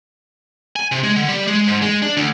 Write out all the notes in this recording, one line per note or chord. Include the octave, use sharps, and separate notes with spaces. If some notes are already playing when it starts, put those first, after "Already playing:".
G#5
C3
G#3
D3
G3
G#3
G#2
G#3
D4
D2